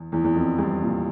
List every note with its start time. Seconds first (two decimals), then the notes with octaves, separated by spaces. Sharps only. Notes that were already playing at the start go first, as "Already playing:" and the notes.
Already playing: E2
0.12 E2
0.24 E2
0.35 F2
0.58 G2
0.82 A#2